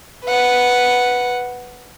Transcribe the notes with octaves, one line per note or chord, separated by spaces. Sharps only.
B4 F#5